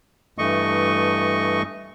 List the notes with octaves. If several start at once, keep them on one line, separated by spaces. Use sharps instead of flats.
G2 E3 A3 D#5 C#6